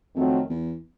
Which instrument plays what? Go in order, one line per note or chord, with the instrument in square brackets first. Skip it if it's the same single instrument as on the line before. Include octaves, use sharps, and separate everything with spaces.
[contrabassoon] F2 [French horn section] D#3 F#3 A3 C4
[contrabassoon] E2